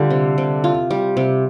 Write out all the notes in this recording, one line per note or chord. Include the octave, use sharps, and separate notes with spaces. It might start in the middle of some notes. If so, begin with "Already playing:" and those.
Already playing: D3 G3 F4
C3
C3
F4
G3
C3